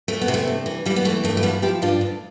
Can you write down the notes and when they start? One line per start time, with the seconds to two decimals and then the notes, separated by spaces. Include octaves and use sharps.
0.08 E2 A3
0.21 B3
0.28 C3
0.34 A3
0.47 G2
0.66 E3
0.86 E3 G3
0.96 B3
1.05 E3 A3
1.24 G2 A3
1.37 A3
1.43 F3 G3 B3
1.62 F3 E4 G4
1.82 G2 D4 F4
2.01 D2